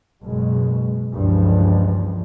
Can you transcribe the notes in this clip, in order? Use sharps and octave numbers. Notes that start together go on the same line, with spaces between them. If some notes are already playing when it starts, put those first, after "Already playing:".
F#1 B2 G#3
C#2 G2 A#2 E3 F3 G#3